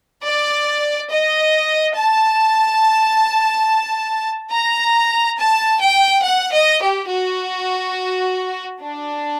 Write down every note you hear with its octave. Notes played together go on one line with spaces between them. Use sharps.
D5
D#5
A5
A#5
A5
G5
F#5
D#5
G4
F#4
D4